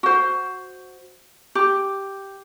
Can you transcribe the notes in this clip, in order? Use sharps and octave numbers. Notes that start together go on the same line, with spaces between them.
F#4 C5
G4